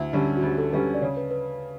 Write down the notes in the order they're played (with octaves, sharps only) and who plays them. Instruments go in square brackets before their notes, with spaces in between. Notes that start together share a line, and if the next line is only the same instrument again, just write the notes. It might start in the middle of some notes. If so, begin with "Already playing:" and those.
Already playing: [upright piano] D2 [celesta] E4 E5
[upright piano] D3 G3 C#4
[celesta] F#4
[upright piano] D2
[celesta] G4
A4
[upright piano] D3 G3 C#4 [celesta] B4
[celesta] D5
[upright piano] C#3 [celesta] C#5
[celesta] B4
B4